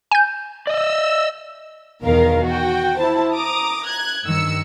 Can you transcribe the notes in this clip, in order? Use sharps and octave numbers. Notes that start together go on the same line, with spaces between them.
G#5 G6
D5 D#5 E6
E2 B2 D#3 A#4 F5
F#4 G5
E4 C5 A5
A#5 D6 D#6
F#6 G#6
G2 D#3 E6 C#7